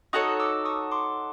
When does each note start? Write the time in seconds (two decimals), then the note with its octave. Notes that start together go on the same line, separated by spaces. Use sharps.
0.13 D#4 F#4 A4 C#5 C#6 D#6
0.40 D6 E6
0.65 C#6 D#6
0.91 C6 D6